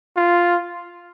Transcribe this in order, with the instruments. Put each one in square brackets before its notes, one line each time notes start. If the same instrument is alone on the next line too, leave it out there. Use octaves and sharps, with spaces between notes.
[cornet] F4